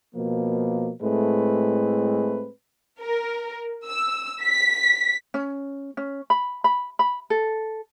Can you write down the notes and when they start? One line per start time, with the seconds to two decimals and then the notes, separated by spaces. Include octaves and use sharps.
0.15 B2 F3 A#3
1.01 A2 G#3 A3 C4 B4
3.01 A#4
3.86 E6
4.43 B6
5.34 C#4
5.97 C#4
6.30 B5
6.64 B5
6.99 B5
7.30 A4